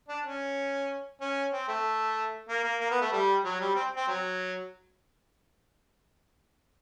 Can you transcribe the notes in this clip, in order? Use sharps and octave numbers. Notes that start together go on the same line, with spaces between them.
D4
C#4
C#4
C4
A3
A#3
A#3
A#3
B3
A3
G3
F#3
G3
C4
C4
F#3